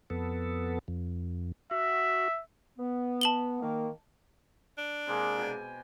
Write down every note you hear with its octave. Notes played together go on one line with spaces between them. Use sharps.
F2 B3 A4
F2
F#4 E5
B3
A5 F#7 G7
D#3 A#3
D4
C3 G#3 A#3
B2 G5 G#5